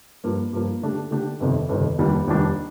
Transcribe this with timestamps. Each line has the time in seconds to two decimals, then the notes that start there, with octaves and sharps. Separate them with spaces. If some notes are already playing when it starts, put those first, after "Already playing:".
0.24 G2 F3 A#3
0.53 G2 F3 A#3
0.82 D3 A3 D4 G4
1.11 D3 A3 D4 G4
1.40 G1 F2 C3 D#3
1.69 G1 F2 C3 D#3
1.98 F1 D#2 D#3 G3 D4
2.27 F1 D#2 D#3 G3 D4